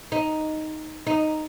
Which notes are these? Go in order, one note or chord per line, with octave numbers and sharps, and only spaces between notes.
D#4
D#4